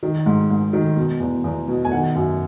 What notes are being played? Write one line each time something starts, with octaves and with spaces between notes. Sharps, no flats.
D#3
G#2
G#2
D#3
B2
E2
E2
B2
G#5
D#3 F#5
F#2